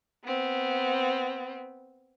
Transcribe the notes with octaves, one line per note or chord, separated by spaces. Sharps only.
B3 C4